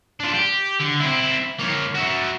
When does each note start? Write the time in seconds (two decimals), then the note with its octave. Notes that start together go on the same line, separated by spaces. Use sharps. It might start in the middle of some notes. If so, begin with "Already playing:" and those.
0.20 D4 F4
0.34 G4
0.80 D3
1.00 C4 E4
1.59 A#3 C#5
1.95 F#4 E5